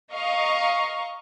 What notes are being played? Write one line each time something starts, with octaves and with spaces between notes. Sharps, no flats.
D#5 F5 A#5 C#6